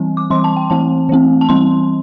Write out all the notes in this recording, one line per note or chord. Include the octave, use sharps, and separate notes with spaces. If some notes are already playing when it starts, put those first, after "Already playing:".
Already playing: E3 G3 C4
D6
E3 G3 C4 C6
A5
G5
E3 A3 C4 A5
E3 A3 C4
A5
E3 G3 C4 C6